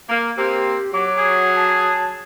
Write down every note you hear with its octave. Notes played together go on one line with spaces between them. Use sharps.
A#3
A#3 C4 G4
F#3 D6
G#4
A5